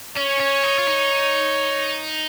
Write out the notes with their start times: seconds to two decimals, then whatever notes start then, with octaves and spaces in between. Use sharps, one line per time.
0.17 C#4 C#5
0.40 C#4
0.63 D#4
0.79 F4
0.88 D#4